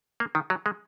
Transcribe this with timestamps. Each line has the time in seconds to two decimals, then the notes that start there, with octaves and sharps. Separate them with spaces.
0.20 A#3
0.35 D#3
0.50 F#3
0.66 G#3